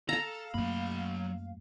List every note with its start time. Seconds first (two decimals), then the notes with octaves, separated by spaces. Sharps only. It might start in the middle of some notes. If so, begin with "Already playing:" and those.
0.09 A4 F5 A#5
0.54 F#2 F#3 A3 A#3 B5